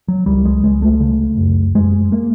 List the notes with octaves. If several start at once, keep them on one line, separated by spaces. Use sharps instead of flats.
F#3
C#2 G3
G#3
C#2 G#3
A3
C#3
F#2
F#2 G#3
A#3